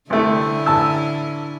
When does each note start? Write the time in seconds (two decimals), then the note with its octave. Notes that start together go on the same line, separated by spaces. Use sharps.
0.10 C2 D3 A3 C#4 E4
0.66 A1 A5 E6